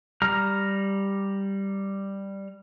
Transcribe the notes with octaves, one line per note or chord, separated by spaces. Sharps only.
G3 A#5 F6